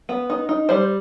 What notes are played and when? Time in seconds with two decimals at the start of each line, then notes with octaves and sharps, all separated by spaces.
0.09 B3
0.30 D#4
0.49 D#4
0.69 G3 C5